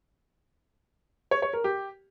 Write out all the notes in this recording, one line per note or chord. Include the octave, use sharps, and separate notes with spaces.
C#5
C#5
A#4
G4